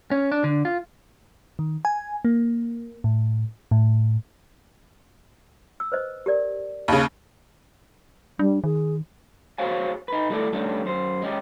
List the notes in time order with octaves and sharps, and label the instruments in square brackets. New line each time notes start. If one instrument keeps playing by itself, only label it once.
[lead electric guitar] C#4
D4
D3
F4
[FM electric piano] D#3
G#5
A#3
A2
A2
[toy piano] E6
B4 C5 D#5
G4 A#4 D5
[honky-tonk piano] D#2 C#3 [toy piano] D#5 A5 B5
[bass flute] G3 [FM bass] D4
[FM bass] D#3 [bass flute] G#4
[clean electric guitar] F#4 G#4 C5 C#5 F5 G#5
D#4 B4
G3 A3 E4 A4 D5
G3 A3 C#4 D4 G4
F#2 C5
G#3 C#4 G4